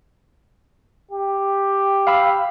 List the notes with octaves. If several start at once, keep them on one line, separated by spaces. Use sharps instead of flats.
G4
F5 B5 E6